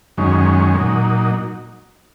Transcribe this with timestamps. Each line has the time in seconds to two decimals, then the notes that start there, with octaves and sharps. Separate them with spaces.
0.17 F#2 D#3 G#3 C#4
0.75 A#2 F#3 D#4